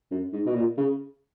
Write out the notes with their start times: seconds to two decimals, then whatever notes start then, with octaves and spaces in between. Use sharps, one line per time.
0.11 F#2
0.33 G#2
0.46 B2
0.55 A#2
0.77 C#3